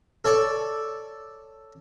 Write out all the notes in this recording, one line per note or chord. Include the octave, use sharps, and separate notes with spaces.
A4 C#5 D5 A5